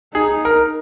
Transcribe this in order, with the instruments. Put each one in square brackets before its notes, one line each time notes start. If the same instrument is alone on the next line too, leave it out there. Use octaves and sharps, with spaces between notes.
[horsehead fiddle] D#4 [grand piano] G#4
[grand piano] A#4